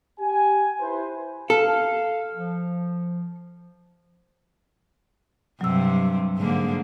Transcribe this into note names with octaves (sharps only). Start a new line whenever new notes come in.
G4 G#5
E4 B4 C5
A4 F5
F3
G2 C3 F#3 E6
G#2 D3 A#3